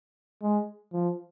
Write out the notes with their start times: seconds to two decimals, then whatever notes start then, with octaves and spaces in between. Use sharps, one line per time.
0.42 G#3
0.93 F3